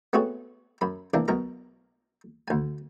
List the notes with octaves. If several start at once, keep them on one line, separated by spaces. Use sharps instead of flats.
A3 B3 C4 F#4 G#4 C#5
F#2 B5
C3 E3 A#3 D4
B1 B2 A#4 A#5
D2 G#5